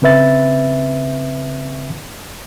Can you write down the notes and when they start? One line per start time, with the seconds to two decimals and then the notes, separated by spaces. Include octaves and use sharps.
0.02 C#3 C4 B4 E5 A6